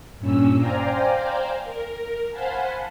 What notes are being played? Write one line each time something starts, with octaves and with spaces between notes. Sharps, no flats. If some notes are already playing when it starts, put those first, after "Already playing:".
G2 A#2 C#4 E6
C5 D5 F5 G5 G#5 A#5
A#4
C5 F5 F#5 G#5 A5 B5